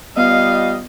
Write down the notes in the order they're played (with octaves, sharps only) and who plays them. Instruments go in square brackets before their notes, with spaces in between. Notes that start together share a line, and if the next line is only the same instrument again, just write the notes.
[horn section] G3 F4 D#5 [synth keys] B3 [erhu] F5